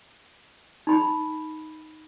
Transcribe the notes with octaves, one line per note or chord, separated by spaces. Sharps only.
D#4 B5